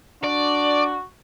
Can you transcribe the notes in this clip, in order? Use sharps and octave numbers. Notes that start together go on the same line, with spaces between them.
D4 F#4 D5